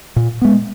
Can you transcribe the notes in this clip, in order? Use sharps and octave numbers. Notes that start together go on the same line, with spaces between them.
A#2
G#3 B3